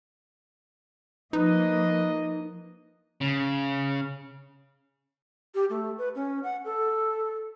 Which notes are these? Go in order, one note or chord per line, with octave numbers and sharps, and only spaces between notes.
F3 A#3 D#4 B4 D#5
C#3
G4
A3
B4
C#4
F#5
A4